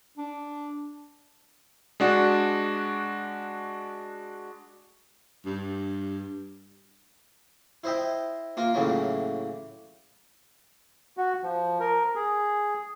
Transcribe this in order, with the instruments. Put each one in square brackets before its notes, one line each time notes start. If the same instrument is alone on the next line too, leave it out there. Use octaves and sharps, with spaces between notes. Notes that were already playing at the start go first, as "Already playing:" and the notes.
[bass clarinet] D4
[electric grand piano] G#3 D4 F#4
[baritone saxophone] G2
[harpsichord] E4 C5 D#5 E5 G5
A#3 F4 A#4
A2 C#3 E3 F#3 A#3
[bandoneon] F#4
F3
A#4
G#4